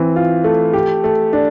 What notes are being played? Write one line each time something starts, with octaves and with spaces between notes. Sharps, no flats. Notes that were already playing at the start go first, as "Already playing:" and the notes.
Already playing: E3 C4
F4
A3
G4
A3
D4